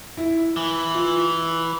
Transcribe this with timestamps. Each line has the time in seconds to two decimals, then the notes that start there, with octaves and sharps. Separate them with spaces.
0.17 E4
0.57 E3
0.95 F4